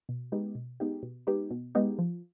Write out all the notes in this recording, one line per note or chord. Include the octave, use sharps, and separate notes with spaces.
B2
G#3 B3 D#4 G4
B2
G#3 B3 D#4 G4
B2
G#3 B3 D#4 G4
B2
G#3 B3 D#4 G4
F3